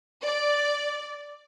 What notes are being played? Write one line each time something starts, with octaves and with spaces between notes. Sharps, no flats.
D5